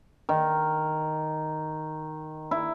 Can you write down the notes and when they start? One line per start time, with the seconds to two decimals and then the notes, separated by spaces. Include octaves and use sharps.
0.29 D#3
2.51 E4